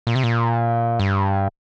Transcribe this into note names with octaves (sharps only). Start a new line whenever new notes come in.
A#2
C3
A#2
G2